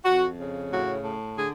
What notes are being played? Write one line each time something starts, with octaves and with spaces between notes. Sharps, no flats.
F2 F#4
C#3
A2 F#4
A2
D3 G#4